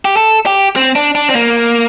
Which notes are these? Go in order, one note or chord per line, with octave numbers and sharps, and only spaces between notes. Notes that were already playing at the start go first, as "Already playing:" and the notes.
G4
A4
G4
C4
D4
D4
C4
A#3